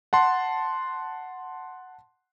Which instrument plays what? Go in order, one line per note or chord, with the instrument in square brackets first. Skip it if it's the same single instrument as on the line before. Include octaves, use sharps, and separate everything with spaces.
[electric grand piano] F#5 A5 C6